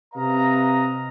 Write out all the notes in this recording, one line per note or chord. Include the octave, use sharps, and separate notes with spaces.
C3 B4 D#5 F5 A#5